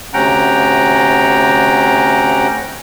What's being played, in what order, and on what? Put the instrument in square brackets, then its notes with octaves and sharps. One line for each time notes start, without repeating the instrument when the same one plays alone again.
[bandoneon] D2 C3 C#4 F#5 G5 A#5